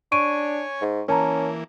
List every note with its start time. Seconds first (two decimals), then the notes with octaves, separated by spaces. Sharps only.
0.12 D4 C#5 G#5 C#6 D7 D#7
0.82 G#2
1.08 E3 A#3 C#4 A#4 A5 A#5